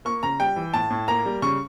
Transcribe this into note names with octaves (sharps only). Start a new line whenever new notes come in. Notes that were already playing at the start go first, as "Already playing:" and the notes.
A#3 C#6
C#3 A#5
G3 G5
E3
A2 A5
A2
A#3 A#5
G3
C#3 C#6